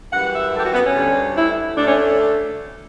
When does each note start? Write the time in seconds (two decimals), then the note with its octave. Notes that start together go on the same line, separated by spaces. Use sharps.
0.13 F#2 E3 G3 F#5
0.33 E5
0.54 A4
0.60 G4
0.64 F#4
0.74 B3
0.84 C#4
0.95 D2 D3 G3
1.36 E4
1.77 D2 D3 A3 D4
1.86 C#4